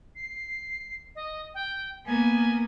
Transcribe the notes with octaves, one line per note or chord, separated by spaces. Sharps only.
C7
D#5
G5
A#3 B3 G#5